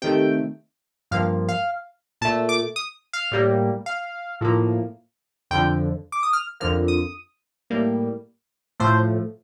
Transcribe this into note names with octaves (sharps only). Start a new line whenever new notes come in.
C3 D#3 A3 G5
G2 F3 A#3 F5
F5
A#2 A3 A5
D6
D#6
F5
A2 G3 A#3
F5
A2 F3 A#3
F2 D3 F3 G5
D6
D#6
F6
F2 D3 F3 A#3 F6
D#6
A2 G3 A#3
A2 F3 A3 C5